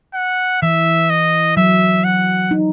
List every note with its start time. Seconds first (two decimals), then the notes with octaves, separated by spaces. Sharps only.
0.14 F#5
0.62 E3 E5
1.10 D#5
1.57 F#3 E5
2.04 F#5
2.51 D#4